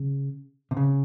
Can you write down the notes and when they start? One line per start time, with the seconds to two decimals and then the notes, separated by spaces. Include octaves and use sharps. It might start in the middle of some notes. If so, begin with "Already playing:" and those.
Already playing: C#3
0.71 C3
0.77 C#3